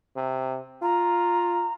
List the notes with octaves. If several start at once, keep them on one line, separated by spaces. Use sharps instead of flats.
C3
F4 A#5